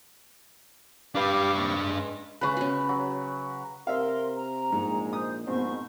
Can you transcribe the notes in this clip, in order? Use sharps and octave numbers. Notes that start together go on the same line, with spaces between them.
D4 G4 B4 F5 D6
D#2 C3 C#6
G#3
C#3 G#3 B4 B5 C#6
C#4 F#4
F#3
C3 A#4 E5 F5 C6
A#5
A#1 G#2 G#3
C5 D#6
A#1 G#2 B2 C4 C5 C#6